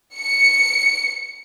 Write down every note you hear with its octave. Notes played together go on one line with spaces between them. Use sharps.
C#7